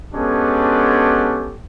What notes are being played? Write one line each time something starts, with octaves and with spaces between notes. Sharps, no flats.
G#3 B3 C#4 D4 G4 A4